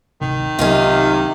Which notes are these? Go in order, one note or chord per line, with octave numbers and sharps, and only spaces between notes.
D1 G#1 C3 D#3
C2 C3 F#3 C#4 D#4 F4